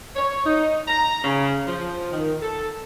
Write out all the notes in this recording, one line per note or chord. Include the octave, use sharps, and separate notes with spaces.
C#5
D#4
A#5
C#3
F3
D#3
A4